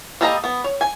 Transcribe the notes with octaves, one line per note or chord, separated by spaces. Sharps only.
G3 A#3 A4 D#5 A#5
B3
C#5
G#5